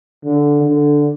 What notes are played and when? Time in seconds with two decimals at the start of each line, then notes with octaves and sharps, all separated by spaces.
0.25 D3
0.63 D3